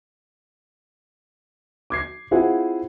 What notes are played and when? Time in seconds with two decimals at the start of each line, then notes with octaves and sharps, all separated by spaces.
1.90 D6 G#6 C7
2.31 C4 E4 F4 G#4 C5 F#5